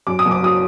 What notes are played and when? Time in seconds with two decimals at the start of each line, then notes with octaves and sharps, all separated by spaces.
0.07 F#2 D6
0.19 D#6
0.25 F#1
0.31 D6
0.43 F#3 D#6